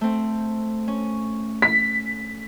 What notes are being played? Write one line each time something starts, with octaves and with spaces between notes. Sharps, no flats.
A3 C4
C#4
B6